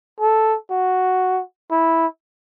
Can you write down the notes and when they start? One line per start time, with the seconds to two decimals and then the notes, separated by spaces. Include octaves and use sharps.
0.20 A4
0.70 F#4
1.71 E4